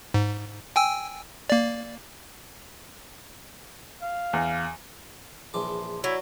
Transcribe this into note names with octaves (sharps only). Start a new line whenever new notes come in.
G#2
G5 G#5 E6
A#3 D5
F5
E2
A#1 E3 G#4 A5 C6 D6
F#3 E4 F#4 D5